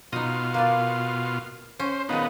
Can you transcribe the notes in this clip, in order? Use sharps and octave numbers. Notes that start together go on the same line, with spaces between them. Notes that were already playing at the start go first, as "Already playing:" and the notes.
B2 D#4 F4 D#5
A#3 B4 D5
C#4 C5
A#2 D#3 G#3 B3 D#4